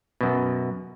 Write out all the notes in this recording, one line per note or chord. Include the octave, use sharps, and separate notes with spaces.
F#2 B2